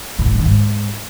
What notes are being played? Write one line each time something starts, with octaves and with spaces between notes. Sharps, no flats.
A#2
A2
F#2
D#3
G#2